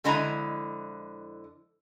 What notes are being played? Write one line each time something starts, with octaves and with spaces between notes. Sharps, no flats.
F2 D3 G#3 E4 D#5 A#5